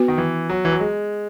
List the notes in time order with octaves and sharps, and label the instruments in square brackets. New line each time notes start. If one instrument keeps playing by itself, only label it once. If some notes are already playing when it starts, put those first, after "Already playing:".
Already playing: [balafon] B3 F#4 B4
[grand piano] D#3
E3
F#3
E3
F#3
G#3